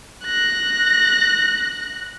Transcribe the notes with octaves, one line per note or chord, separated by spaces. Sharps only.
F#6 A#6